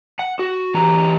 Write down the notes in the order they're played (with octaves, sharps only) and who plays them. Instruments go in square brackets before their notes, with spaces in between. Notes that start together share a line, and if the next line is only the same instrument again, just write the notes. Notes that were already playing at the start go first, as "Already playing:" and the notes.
[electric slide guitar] F#5
F#4
E3 G4 A#5